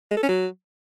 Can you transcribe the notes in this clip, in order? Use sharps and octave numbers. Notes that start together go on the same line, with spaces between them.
G#3
A4
C#4
F#3